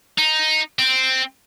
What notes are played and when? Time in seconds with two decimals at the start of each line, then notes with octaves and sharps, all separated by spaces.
0.18 D#4
0.79 C4